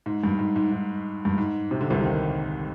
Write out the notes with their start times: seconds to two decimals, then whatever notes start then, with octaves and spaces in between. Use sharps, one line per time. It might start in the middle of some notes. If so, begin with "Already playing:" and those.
0.06 G#2
0.24 G2
0.39 G#2
0.56 G#2
0.72 G#2
1.25 G2
1.38 G#2
1.71 C3
1.81 D3
1.90 C2 C3
2.03 D#2 D#3